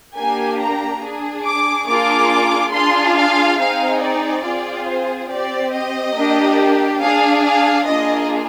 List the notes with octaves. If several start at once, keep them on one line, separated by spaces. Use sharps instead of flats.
A#3 D4 G4 G#5
A#5
D4 G#4
D6
A#3 D4 F4 G#4 D6
D4 F4 G#4 C6
F5
C4 D#4 G#4 F5
D5
C4 F4 G#4
C5
C4 G4 D5
D#5
A#3 D4 G4
D4 G#4 F5
F5
A#3 D4 F4 G#4 D#5